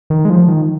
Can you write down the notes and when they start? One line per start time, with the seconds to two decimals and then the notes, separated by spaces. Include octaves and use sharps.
0.10 D#3
0.25 G#3
0.30 F3
0.48 D#3